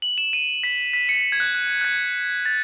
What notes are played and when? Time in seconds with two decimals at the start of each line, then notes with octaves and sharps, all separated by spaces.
0.02 F#7
0.18 E7
0.33 D#7
0.63 B6
0.93 B6
1.09 C#7
1.32 G#6
1.40 F#6
1.55 F#6
1.81 F#6
1.85 G#6
2.46 A6